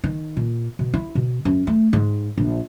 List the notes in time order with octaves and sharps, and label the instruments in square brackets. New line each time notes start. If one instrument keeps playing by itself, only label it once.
[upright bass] D#3
A#2
B2
E4
B2
F#2
A3
G#2
A#1